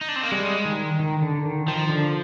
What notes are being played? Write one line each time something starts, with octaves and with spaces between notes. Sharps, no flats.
D#4
D4
C4
A#3
G3 G#3
D#3
D#3
D3
D#3
D#3 F3
D3